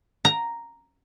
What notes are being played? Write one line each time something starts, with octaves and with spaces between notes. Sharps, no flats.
A#5